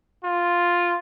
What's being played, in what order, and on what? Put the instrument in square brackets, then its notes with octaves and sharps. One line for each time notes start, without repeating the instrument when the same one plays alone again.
[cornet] F4